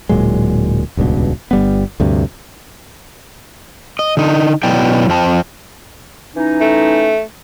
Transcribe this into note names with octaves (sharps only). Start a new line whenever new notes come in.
D1 A#2 F#3 G#3
D#1 C#2 G2 B2
G1 G3 B3
D2 G2 C3
D#5
D3 D#4
B2 F#3 E4 C#5 D5 G5
F2 C4 A5
E3 C#4 D#4
A3